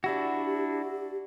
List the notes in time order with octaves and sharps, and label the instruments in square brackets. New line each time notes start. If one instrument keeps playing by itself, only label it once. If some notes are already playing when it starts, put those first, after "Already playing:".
[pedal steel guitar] D4 E4 F#4 [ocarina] G4